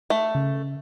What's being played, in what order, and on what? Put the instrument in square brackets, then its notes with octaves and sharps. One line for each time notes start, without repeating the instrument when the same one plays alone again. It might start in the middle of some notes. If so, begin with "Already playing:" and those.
[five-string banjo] A3
[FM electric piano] C#3